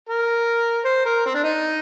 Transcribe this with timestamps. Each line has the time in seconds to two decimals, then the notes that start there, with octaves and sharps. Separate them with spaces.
0.09 A#4
0.85 C5
1.06 A#4
1.26 C4
1.34 D4
1.44 D#4